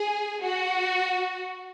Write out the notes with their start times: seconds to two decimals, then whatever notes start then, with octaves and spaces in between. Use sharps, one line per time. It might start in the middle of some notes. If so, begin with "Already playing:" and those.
Already playing: G#4
0.42 F#4